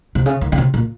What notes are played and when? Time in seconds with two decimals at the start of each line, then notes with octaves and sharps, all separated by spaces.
0.15 C3
0.26 C#3
0.41 D#3
0.52 C#3
0.58 C3
0.74 A#2